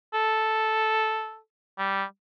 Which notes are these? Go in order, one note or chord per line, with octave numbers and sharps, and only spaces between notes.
A4
G3